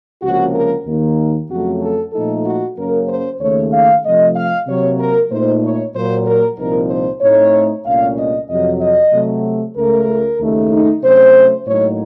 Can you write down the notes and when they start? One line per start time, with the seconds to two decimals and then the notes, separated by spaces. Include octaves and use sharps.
0.22 C#2 C3 F3 A#3 C#4 F#4
0.54 A#4
0.86 D#2 D#3 A#3 D#4
1.49 F2 C#3 F#3 A3 F#4
1.81 A4
2.13 A#2 F3 A3 D#4 A4
2.46 F#4
2.77 F#2 C#3 F#3 A#3 C#4 A#4
3.08 C5
3.41 D#2 C#3 A3 C#5
3.73 F5
4.04 C3 F3 A3 D#5
4.36 F5
4.67 C3 F#3 A#3 C#5
4.99 A#4
5.31 A#2 A3 D#4 C5
5.63 C#5
5.94 A#2 F#3 A#3 C5
6.27 A#4
6.58 C2 A#2 F3 C4 D#4 A#4
6.90 C5
7.21 A2 A3 C4 D#4 C#5
7.85 C2 A#2 A3 C#4 F5
8.18 D#5
8.49 F2 C3 F#3 D#5
8.81 D#5
9.13 C3 F#3 A3
9.76 C#2 C#3 A3 A#4
10.40 D#2 C#3 A3 D#4
10.72 D#4
11.03 C3 F#3 A3 C#4 C5
11.66 A2 F#3 A#3 D#4 C#5